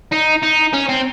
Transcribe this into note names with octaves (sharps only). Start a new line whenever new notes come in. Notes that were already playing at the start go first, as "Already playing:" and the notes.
D#4
D#4
C#4
C4